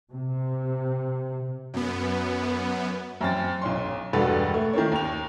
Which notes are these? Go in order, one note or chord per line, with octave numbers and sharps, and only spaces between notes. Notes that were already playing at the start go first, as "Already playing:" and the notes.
C3
F#2 B3
F#2 C4 A6
B1 C#4 C6
E1 G2 F#4 A4 B4 D5
A3
D#3 A3 A#3 C#4
D#2 F7